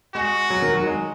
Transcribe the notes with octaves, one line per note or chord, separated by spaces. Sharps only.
G#3 F#4
F#3
D#3
F#3
G#3